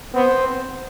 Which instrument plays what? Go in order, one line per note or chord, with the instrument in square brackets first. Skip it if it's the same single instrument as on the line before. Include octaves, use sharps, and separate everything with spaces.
[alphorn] B3 [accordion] C4